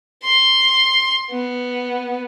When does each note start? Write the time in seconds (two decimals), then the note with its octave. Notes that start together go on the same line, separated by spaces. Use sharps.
0.24 C6
1.31 B3